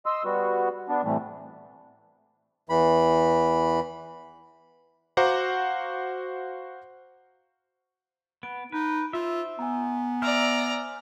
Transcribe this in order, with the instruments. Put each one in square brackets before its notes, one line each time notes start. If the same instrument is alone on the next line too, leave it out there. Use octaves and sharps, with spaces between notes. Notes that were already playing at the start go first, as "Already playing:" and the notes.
[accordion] D#5 C6 E6
G3 B3 F#4
B3 D4
A2 C3 E3 G3 A3
[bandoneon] E2 E3 B5
[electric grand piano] F#4 C5 F5 F#5 A#5 D6
[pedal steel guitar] B3 [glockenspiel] D7
[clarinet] D#4 [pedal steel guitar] B4
[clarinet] F4 [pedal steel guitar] C5 E5
[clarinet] B3 [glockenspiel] G#5 A#5
[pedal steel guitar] C5 E5 [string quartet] D5 A#5 [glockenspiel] F6